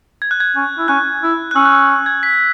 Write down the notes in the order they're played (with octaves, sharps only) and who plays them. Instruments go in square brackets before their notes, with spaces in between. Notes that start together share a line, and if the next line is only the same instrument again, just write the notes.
[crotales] G#6
F#6
G#6
[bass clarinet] C#4
E4
[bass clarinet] C#4 [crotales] F#6
[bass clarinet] E4
[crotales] F#6
[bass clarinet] C#4 [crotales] E6
[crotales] F#6
E6
E6
G#6
B6